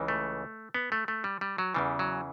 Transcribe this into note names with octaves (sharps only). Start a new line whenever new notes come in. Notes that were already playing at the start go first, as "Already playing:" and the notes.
Already playing: C#2 C#3 E3
A3
B3
A3
A3
G3
G3
F#3
E2 C#3 E3 G3
F#3